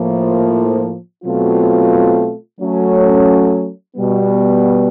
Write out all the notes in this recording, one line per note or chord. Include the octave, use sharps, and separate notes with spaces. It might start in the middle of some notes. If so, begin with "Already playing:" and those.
Already playing: A2 F3 A#3
B2 F#3 A3 C4 F4
F#3 A3 C#4
B2 G3 B3